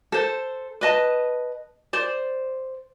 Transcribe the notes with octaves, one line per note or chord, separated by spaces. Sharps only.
A4 C5
B4 D#5 A5
C5 D5